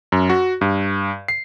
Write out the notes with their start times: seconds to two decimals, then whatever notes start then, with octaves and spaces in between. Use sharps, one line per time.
0.12 F#2
0.30 F#4
0.61 G2
1.28 C7